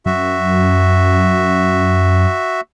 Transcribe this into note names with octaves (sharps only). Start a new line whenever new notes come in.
F#2 F#4 E5